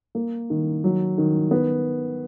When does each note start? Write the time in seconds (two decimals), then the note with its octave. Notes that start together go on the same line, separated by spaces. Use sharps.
0.15 A#3
0.50 D#3
0.84 F#3
1.18 D#3
1.51 B3